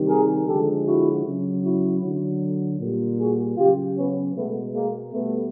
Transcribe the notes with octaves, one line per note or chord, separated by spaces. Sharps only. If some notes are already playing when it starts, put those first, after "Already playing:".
Already playing: C3 D#3 G3
G#4 A#4
D3 F3 G#3 G4 A4
E4 F#4
C#3 F#3
E4 F#4
D3 F#3
A#2 G3
F#4 G#4
C#3 F#3 F4 G4
B3 C#4
B2 G#3 A3 B3
G#3 A#3
B2 G3 A3 B3